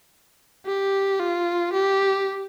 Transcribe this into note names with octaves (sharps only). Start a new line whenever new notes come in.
G4
F4
G4